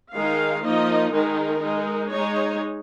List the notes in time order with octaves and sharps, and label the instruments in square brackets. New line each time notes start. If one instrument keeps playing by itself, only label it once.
[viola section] D#3 G#3 D#4 F5
F3 A#3 D#4 D#5
D#3 G#3 D#4 A#4
G#3 D#4
G#3 D#4 C#5